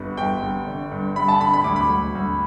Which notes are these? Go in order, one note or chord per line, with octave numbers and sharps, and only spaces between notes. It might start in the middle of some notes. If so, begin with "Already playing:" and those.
Already playing: G1 G2 B3
G1 G5
G1
D3
G2
G2 B5
A5
D3 B5
B5
D2 D6
B5
D2
D2